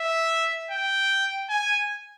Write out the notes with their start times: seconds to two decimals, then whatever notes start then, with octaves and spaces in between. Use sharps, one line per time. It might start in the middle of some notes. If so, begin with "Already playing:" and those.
Already playing: E5
0.71 G5
1.49 G#5